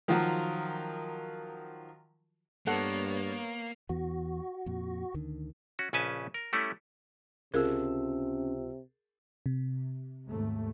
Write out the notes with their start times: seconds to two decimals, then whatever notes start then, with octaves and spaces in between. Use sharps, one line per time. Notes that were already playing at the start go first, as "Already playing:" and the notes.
0.08 D#3 F3 F#3 F4 F#4 A#4
2.67 G2 A#3 B3 A4 C#5 F#5
3.89 E2 E3 B3 F#4
4.66 F2 A#2
5.14 D2 D3 D#3
5.79 C#4 F#4
5.93 A#1 C#3 C#4 B4 G#5 A5
6.34 A#4
6.53 G3 A3 C#4 E4
7.54 C#2 C3 C#4 F4 G#4 A#4 A5 E6
9.46 C3
10.27 D#2 G#2 A3